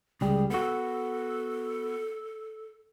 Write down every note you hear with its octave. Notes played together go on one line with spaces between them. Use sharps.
C#2 G3 G#4
B3 F#4 A4